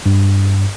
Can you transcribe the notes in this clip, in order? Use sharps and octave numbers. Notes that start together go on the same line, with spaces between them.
G2